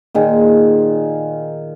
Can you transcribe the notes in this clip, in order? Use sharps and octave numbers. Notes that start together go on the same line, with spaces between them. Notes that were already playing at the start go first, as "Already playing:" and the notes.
A#2 D#3 G#4